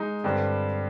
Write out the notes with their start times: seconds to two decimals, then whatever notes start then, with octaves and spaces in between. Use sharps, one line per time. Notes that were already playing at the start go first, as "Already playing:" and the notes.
Already playing: G#3 D#4
0.24 G2 D3 G3 C4